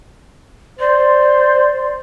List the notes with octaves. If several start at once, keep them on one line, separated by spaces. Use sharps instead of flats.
C5 D5